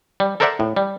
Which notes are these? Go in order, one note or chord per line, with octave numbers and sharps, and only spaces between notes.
G3
A4 A#4 C5 D5 E5 F#5
A2
G3